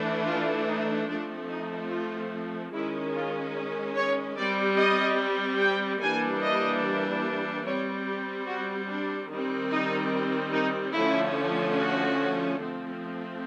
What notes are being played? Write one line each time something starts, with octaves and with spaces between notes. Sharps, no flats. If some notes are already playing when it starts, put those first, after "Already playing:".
Already playing: E3 A3 D4
F4
D#4
F3 A3 C4 D4
D#4
F4
D#3 G#3 C#4 E4
F4
C#5
G3 C4 D5
D#5
G5
E3 G3 A#3 D4 G#5
D#5
G3 C4 C#5
G4
F#4
D4
D#3 G3 C4
D#4
D#4
D3 F3 A3 C#4 E4
F#4
F3 A3 C4